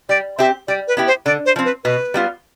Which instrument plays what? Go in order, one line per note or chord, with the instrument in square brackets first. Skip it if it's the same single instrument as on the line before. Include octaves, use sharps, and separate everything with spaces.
[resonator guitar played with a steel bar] G3 [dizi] D5
[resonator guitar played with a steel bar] C4 G4 [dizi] E5
[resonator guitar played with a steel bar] G3 [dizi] D5
[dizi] B4
[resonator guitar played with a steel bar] B3 E4 G4
[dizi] C5
[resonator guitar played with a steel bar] D3 [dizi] D5
[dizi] C5
[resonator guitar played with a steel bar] F3 C4
[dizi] B4
[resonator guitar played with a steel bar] B2 [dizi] B4
[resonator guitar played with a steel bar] G3 B3 F4